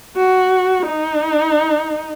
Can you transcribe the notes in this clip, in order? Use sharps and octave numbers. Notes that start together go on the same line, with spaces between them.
F#4
D#4